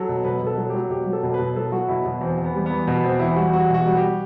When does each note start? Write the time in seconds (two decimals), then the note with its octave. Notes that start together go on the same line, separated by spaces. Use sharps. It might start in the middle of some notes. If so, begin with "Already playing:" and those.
Already playing: F#3 A4
0.09 B2
0.25 B2 B4
0.42 B2
0.47 A4
0.57 F#3
0.69 F#3 G4
0.90 B2 G4
1.06 F#3
1.13 A4
1.23 B2
1.34 B4
1.39 B2
1.56 F#3 A4
1.72 F#3 F#4
1.88 B2 E4
2.06 B2
2.21 E2 C4
2.38 E2
2.44 B3
2.54 G3
2.66 E2 B3
2.87 B2 B3
3.04 E2 C4
3.19 E2 E4
3.36 G3 F#4
3.53 E2 F#4
3.70 B2 F#4
3.85 G3
3.97 G4